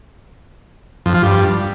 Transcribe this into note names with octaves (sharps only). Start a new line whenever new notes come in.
F2
F3
G2